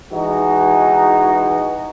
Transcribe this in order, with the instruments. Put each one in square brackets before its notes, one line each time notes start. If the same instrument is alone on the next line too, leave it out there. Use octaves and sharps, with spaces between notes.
[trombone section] E3 G#3 D#4 F#4